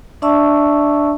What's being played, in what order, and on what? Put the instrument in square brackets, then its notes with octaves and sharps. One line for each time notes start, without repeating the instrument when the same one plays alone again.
[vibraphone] D4 D5 E5 A5 C#6 E6